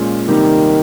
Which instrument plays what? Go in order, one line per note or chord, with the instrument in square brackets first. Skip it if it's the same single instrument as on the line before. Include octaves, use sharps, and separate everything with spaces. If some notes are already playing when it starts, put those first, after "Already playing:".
Already playing: [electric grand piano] A#2 G#3 C#4 F4
[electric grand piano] C3 G3 A#3 D#4 G4 [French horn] D#3